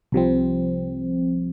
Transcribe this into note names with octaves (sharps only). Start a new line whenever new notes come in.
C2 C3 F3 C4